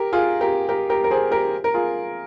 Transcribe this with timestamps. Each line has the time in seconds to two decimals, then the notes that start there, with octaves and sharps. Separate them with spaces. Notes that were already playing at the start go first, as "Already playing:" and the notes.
Already playing: G4 A#4
0.13 F4 G#4
0.41 G4 A#4
0.69 G4 A#4
0.90 G4 A#4
1.04 A#4
1.11 G#4 C5
1.31 G4 A#4
1.64 A#4
1.74 F4 G#4